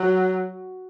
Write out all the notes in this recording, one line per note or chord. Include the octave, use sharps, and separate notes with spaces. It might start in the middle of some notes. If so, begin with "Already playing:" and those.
Already playing: F#3